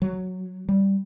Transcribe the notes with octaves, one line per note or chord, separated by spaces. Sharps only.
F#3
G3